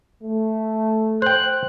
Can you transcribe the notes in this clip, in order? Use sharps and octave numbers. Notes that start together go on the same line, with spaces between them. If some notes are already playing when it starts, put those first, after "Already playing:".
A3
C5 G5 F#6